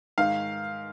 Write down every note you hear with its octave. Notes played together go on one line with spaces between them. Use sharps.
G#2 D#3 F5